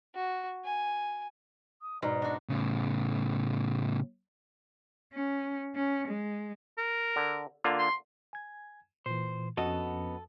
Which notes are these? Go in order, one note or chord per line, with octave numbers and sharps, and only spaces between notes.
F#4
G#5
D#6
G#2 B2 D5 A#5 C6
D4 F#4 D#5
A2 C#3
C#4
C#4
G#3
A#4
D3
D3 A#3 F4
C6
G#5 G#6
A#2 E3 C5
F2 F3 B3 C#4 F#4 A4 D#5